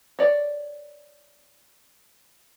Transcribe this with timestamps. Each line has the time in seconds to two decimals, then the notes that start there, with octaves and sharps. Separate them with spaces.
0.19 C#5 D5